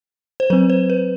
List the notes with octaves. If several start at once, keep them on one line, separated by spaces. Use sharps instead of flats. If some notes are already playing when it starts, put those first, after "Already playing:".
C5
F#3 C4 B4
C5
B4